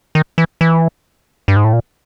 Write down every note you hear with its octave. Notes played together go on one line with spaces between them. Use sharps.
D#3
E3
E3
G2
G#2
A2
A#2